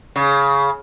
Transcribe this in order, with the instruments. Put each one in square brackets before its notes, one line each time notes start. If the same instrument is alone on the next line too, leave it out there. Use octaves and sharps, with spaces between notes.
[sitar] C#3